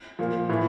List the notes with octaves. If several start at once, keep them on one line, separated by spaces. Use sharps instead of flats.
A#2 F3 A#3
A2 E3 A#3